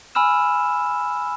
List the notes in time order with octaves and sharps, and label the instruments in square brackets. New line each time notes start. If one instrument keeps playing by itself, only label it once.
[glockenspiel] G#5 B5 E6 F6 E7